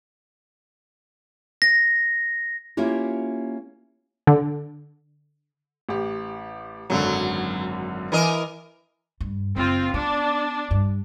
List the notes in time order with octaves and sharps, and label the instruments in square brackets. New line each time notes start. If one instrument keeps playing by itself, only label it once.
[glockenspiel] A#6
[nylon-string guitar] A#3 C#4 E4 F4 G4
[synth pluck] D3
[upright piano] A1 G4
[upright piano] G#1 F#2 D3 [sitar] F#3
[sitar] E3 A#4 D#5
[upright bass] G2
[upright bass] F#1 [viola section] C4 F4
[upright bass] B3 [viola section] D4
[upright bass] G2